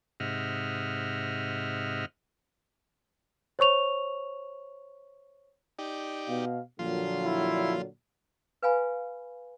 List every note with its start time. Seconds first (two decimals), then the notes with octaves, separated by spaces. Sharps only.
0.20 G#2 C3 D#5 E5 F#5 F6
3.59 C5 C#5 C#6 F7
5.79 D#4 G4 D5
6.28 B2 F5
6.79 A#2 D3 F3 F#3 F4 C6
7.25 E4
8.62 B4 F5 G#5 B5